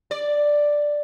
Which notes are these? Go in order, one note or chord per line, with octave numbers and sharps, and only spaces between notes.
D5